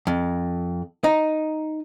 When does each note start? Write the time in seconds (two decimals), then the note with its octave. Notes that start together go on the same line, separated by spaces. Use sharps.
0.07 F2
1.04 D#4